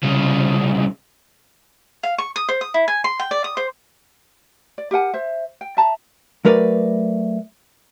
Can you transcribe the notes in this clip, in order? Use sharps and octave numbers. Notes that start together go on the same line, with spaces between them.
C2 C#3
F5
C#6
D#6
C5
D#6
E4
G#5
C6
G5
D5
D#6
C5
D5
G4 A#4 F#5 G#5
C5 E5
G5
E5 A5 A#5
F#3 A3 A#4 B4 D5